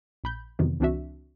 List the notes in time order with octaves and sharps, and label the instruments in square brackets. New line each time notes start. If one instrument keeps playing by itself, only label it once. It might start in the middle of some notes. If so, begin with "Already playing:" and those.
[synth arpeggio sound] A#1 B5 G6
F2 C3 D#3 E3 F#3 B3
C#2 E3 C4 D4 F#4 E5